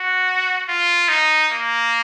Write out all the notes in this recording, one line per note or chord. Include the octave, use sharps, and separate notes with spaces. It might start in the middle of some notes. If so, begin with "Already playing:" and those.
Already playing: F#4
F4
D#4
A#3